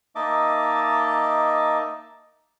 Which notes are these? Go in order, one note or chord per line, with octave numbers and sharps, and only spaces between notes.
A#3 D#4 D#5 E5 A5 D6